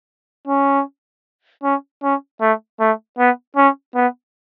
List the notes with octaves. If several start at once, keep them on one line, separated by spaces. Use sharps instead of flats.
C#4
C#4
C#4
A3
A3
B3
C#4
B3